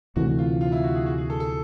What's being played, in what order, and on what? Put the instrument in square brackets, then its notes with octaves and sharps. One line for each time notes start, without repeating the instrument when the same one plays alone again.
[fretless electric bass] D2 C3 E3 A3 [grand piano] F#4
[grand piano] F4
F4
E4
F#4
G#4
F#4
G#4
A4
A4